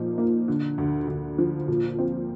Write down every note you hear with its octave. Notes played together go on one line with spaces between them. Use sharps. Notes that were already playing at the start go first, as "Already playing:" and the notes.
Already playing: A#2 F3 D#4
A#3
D3
D2
D2
F3
A#2
C4